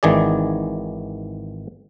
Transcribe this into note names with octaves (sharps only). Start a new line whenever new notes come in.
G#1 D#3 E3 G#4 D5